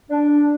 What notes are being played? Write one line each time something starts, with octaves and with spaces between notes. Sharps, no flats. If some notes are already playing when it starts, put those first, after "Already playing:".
D4